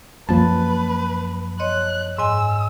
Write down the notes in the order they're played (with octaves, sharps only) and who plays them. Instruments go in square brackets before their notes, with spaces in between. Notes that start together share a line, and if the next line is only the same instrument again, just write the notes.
[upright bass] F#2 A#3 [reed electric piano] F3 A5 [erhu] B4
[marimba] C#5 D#5 C6 [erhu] F#6
[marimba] G#2 D#5 G#5 [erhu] E6